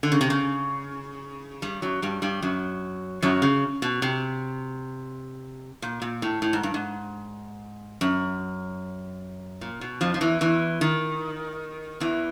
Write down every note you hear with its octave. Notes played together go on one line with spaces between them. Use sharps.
D3
C#3
C3
C#3
G2 G3
F#2 F#3
G2 G3
G2 G3
F#2 F#3
F#2 F#3
C#3
B2
C3
A#2
A#2
A2
A2
G#2
G2
G#2
F#2
A#2
B2
F2 F3
F3
E2 E3
E2 E3
D#3
E2 E3